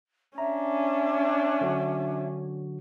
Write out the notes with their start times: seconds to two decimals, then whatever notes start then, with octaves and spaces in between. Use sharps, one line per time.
0.38 C#4 D4 E5 A#5
1.61 D3 F#3 F#4